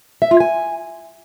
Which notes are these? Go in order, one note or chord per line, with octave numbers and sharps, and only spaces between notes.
E5
F4
G#5